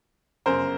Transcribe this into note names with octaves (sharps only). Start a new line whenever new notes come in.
G1 F#2 C#3 A#4 C5